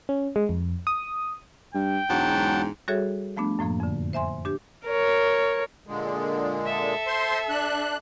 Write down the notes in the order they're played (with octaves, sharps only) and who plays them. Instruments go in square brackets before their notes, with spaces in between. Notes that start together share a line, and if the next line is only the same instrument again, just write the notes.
[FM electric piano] C#4
G#3
F2
D#6
[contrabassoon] G2 [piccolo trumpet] G5
[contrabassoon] E1 [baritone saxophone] G#2 [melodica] F#3 F#5 A5
[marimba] G3 F#4 G#4 A4 C#5 E5
F3 A3 B3 D4
F#2 A2 F3 A#3
F2 D3
C5 E5 G#5 C6
D4 G4 D6
[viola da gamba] A#4 C#5
[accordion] A#2 D3 G#3
[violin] A4 E5
[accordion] C5 C6
D4 F#6